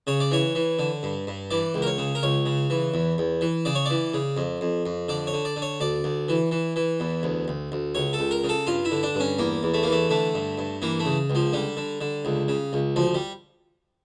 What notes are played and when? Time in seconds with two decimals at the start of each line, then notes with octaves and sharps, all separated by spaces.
0.07 C#3 C#5
0.20 D5
0.31 E3 C#5
0.55 E3
0.79 D3
1.03 G2
1.27 G2
1.51 E3 D5
1.74 C#2
1.82 A#4
1.87 C#5
1.98 C#3
2.15 A#4
2.23 C#2 C#5
2.46 C#3
2.70 E3
2.94 E2
3.18 E2
3.41 E3
3.65 C#3 D5
3.75 C#5
3.86 E3 D5
4.14 C#3
4.37 F2
4.61 F2
4.86 F2
5.09 D3 D5
5.27 C#5
5.33 D3
5.45 D5
5.56 D3
5.62 C#5
5.80 D2 D5
6.04 D2
6.29 E3
6.51 E3
6.76 E3
7.00 E2
7.23 D2
7.48 D2
7.72 D2
7.95 C#2 C#5
8.13 A4
8.19 C#2
8.31 A#4
8.44 C#3
8.49 A4
8.67 G2 F4
8.85 E4
8.91 D3
9.03 D4
9.15 G2 C#4
9.39 E2 A#3
9.63 E2
9.74 A3
9.83 E3 A#3
9.92 A3
10.10 D3 A3
10.34 G2
10.58 G2
10.82 E3 A#3
11.00 A3
11.05 C#3
11.30 C#2
11.35 F3
11.53 D3 G3
11.77 D3
12.01 D3
12.25 C#2
12.48 C#3
12.73 C#2
12.96 D2 F3
13.14 G3